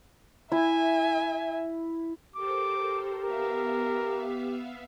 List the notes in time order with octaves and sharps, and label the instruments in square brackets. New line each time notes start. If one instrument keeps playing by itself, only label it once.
[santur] E4 [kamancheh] E5 G#5
[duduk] G4 [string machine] A4 A#4 C5 [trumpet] D6
[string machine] B3 E5 F5 [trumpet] A#4